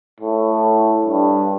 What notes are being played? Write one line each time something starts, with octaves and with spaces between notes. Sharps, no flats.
A2
G2